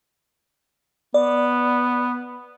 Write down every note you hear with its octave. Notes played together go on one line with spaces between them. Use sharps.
B3 D5